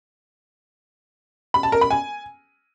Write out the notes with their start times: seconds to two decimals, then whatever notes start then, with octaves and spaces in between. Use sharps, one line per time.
1.54 B5
1.63 A5
1.72 A#4
1.81 B5
1.90 G#5